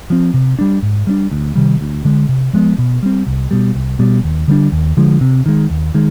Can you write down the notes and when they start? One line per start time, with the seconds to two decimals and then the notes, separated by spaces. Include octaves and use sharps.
0.10 F3 C4
0.34 C3
0.59 G3 D4
0.82 G#2
1.07 G3 B3 D4
1.31 D2
1.55 C3 D#3 G3
1.81 D2
2.05 D3 G#3
2.29 C3
2.53 F3 G#3 B3
2.78 B2
3.03 G3 C4
3.27 C2
3.51 B2 G3
3.75 C2
3.99 B2 G3
4.24 D#2
4.48 D3 G3 D4
4.72 D#2
4.97 D3 F3 G#3
5.21 C3
5.46 D#3 G#3
5.70 D#2
5.94 D#3 G#3